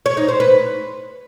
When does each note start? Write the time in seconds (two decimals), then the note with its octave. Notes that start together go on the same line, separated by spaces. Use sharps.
0.06 C#5
0.17 D#4
0.28 C5
0.40 B4